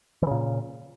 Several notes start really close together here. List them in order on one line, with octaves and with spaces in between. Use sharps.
E3 C#3 A#2